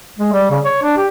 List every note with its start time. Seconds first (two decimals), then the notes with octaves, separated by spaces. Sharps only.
0.19 G#3
0.32 G3
0.50 C#3
0.65 C#5
0.83 D4
0.97 G4